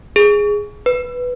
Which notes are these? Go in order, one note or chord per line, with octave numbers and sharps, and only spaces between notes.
G#4
B4